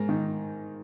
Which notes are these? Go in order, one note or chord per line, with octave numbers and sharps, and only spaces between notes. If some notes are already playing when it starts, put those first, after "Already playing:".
Already playing: G#2 A#4
D#3